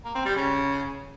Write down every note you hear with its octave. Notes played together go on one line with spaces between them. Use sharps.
A#3
C4
G3
C#3